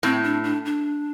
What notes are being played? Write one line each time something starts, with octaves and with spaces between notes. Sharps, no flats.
A2 C4
D4
D4
D4